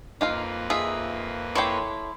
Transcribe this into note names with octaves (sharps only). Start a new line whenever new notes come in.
F2 A#3 D#4 F4 B4 F5 D6
D#4 F4 G#4 E5
E4 A4 C#5 G5 C6 D6